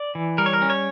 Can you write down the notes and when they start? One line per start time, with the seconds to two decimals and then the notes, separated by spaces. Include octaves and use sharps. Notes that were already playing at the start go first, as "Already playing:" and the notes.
Already playing: D5
0.15 E3
0.38 G3 A#4
0.46 C#5
0.53 A#4
0.62 C#4
0.70 C#5